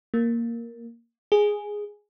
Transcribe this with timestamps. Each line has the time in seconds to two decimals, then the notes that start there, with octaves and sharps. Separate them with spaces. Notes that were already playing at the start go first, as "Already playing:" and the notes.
0.14 A#3
1.32 G#4